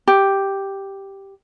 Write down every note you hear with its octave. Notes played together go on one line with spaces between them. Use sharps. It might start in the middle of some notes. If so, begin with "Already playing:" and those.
G4